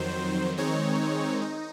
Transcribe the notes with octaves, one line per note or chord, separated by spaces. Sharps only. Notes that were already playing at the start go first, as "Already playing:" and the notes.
Already playing: F2 D#3 F#3 C5
D#3 G#3 C4 D#4 C#5
D#4